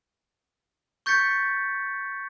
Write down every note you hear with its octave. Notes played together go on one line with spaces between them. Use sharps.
C#6 G6 A6 B6 C#7